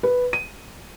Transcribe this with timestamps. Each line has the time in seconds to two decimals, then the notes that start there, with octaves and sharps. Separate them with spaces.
0.03 B4
0.33 D#7